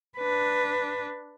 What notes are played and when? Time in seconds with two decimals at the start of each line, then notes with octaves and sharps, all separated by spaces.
0.18 D4 B4